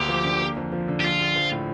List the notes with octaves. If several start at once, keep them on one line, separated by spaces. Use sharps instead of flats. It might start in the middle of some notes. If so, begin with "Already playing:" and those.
Already playing: D2 A#3 G4
F3
D3
A#3
F2
F3
D3
G4
A#1 F4
A#1
F3
A2